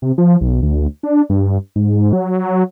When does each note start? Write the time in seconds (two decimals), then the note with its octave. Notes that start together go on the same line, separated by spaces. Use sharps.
0.02 C3
0.18 F3
0.41 B1
0.62 D2
1.03 D4
1.30 G2
1.76 G#2
2.13 F#3